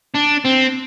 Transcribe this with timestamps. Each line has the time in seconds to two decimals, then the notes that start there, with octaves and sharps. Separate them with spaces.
0.15 D4
0.45 C4